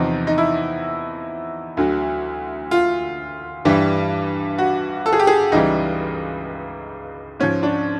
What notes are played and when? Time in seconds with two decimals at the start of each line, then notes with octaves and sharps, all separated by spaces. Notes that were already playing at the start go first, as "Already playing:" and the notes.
Already playing: E2 C3 F3 D#4
0.27 D#4
0.38 E4
1.77 D2 D3 F#3
2.71 F4
3.65 G2 E3 G3
4.58 F#4
5.06 A4
5.13 G#4
5.19 G4
5.27 G#4
5.52 C#2 C#3 E3 G3 D#4
7.40 G#2 F3 C#4
7.63 D4